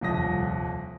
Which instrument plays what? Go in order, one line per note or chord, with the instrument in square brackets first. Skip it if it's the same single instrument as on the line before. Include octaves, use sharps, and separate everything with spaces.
[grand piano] D#1 C2 F2 D#6 A#6